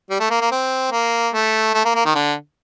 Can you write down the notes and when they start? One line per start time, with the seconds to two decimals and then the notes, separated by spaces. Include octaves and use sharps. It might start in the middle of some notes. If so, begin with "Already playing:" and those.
0.10 G3
0.20 A3
0.30 A#3
0.41 A#3
0.51 C4
0.92 A#3
1.34 A3
1.74 A3
1.85 A#3
1.95 A#3
2.05 D#3
2.15 D3